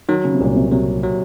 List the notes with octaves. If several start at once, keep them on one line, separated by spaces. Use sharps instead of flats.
D#3 F#3
C#3
C3
C2 A#2
C3
C3 F#3
F#3